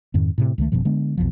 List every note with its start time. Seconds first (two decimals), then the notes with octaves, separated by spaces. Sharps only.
0.14 F2 G#2 D#3
0.38 A2 C3
0.58 C#2 D#3 A3
0.72 G1 F#2 B2 F3
0.85 D3 G#3 B3 D4
1.17 B1 F2 F3